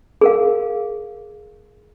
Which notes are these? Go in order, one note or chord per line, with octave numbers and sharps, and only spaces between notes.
G#4 A#4 F5